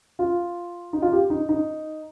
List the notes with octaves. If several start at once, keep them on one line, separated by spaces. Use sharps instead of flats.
F4
D#4
F4
G4
D#4
D#4